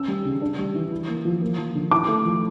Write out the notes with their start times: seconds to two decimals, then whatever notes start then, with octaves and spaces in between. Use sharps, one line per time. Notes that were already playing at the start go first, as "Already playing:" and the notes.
Already playing: C#4 E6
0.08 G3
0.25 C#3
0.41 D4
0.58 G3
0.75 E3
0.92 E4
1.08 A#3
1.25 F3
1.42 A#3
1.58 F3
1.75 D3
1.91 E4 D6
2.08 A3
2.25 F3